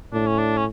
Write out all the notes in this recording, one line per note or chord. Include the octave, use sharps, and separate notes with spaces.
A2 D4
C#4
D4
C#4